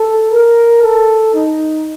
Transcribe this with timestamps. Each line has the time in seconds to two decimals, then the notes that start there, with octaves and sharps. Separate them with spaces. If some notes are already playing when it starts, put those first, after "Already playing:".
Already playing: A4
0.31 A#4
0.82 A4
1.33 D#4